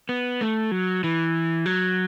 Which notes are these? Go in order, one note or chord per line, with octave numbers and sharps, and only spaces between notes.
B3
A3
F#3
E3
F#3